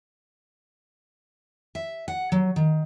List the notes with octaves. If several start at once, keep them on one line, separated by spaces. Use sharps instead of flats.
E5
F#5
F#3
D#3